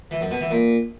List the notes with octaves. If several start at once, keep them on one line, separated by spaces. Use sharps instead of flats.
E3
F#2
B2
E3
A#2